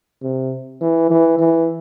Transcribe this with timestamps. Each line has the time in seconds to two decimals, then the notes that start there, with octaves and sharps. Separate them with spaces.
0.22 C3
0.82 E3
1.11 E3
1.39 E3